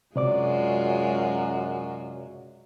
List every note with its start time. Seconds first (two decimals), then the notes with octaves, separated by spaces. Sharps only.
0.16 F#2 C3 G#3 F4 F#4 D5 D6